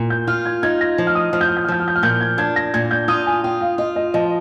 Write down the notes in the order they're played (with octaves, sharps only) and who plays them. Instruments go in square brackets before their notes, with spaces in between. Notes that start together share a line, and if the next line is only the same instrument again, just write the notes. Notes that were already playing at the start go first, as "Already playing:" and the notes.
Already playing: [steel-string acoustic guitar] A#2
[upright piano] G6
[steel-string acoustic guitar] F4 [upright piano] F6
[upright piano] G#6
[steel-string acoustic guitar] D#4 [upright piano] G#6
[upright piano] A#6
[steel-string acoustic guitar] F3
[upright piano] F6
D#6
[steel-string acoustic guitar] F3 [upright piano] F6
[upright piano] G6
F6
G6
F6
[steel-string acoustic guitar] F3 [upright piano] G6
[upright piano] F6
G6
F6
[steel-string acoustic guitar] A#2 [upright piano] G6
[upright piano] G#6
[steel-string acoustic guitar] D4 [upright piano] G#6
[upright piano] A#6
[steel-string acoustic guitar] A#2 [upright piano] G#6
[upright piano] G6
[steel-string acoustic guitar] F4 [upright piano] D#6
[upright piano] G#5
[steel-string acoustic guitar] F4 [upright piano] G5
[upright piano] F5
[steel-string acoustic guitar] F4 [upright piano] D#5
[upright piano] D#5
[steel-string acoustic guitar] F3 [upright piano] D#5